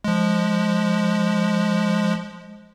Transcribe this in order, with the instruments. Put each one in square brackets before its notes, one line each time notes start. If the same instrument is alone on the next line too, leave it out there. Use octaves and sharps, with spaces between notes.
[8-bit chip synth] F3 G#3